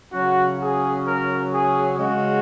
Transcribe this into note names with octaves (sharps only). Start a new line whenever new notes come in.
C#3 F#3 C#4 F#4
G#4
A#4
G#4
C#3 G#3 C#4 F#4